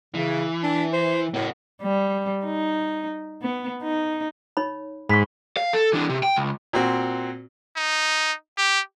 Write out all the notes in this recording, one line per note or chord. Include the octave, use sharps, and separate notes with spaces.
C#3 E3
D4
C5
A2 A#3 F#4
G3
D#4
B3
D#4
D#4 C#5 B5
G#2 B5 C#6 B6
F5
A4
E3 D4
C3
G5
C#2
A#2 C4 F#4
D#4
G4